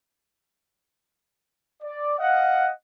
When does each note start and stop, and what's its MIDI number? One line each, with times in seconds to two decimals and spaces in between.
1.83 2.15 74
2.19 2.71 75
2.19 2.71 77
2.19 2.71 78